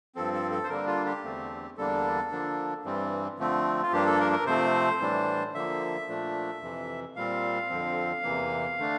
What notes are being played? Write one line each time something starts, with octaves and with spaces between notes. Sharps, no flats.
G2 F3 C4 A4
A4
A4
C5
D3 G3 A#3 D4 A#4
F4
G4
E2 D3 A3 C4
E2 D3 G3 A#3 D4 A4
D3 F3 A#3 D4
G2 E3 G3 C4
D3 F3 A3 C4
F4
G2 F3 A#3 D4 G4
A4
A#4
A#4
C3 F3 A3 C4 C5
A2 E3 G3 D4
D3 F3 A#3 E5
A#2 F3 A3 D4
F2 C3 E3
A#2 G3 C4 F5
F2 D3 F3 C4
E2 C3 E3 A#3
D3 A3 D4